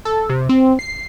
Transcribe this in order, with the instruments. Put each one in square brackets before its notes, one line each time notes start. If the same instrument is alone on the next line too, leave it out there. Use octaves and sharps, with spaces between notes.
[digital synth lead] A4
C3
C4
C7